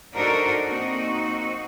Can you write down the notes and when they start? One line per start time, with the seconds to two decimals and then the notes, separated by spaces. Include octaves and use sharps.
0.14 D4 D#4 F#4 A4 A#4 C5
0.65 A#3 C4 D#4 F#4